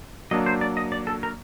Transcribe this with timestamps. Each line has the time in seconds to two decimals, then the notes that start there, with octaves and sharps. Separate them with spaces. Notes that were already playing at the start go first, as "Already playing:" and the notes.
0.31 F#3 A#3 D4 D#5
0.46 C5
0.61 D5
0.77 D#5
0.92 D5
1.07 A4
1.23 A#4